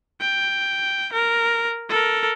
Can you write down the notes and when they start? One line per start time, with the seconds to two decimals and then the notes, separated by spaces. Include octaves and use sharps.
0.21 G5
1.13 A#4
1.90 A4 A#4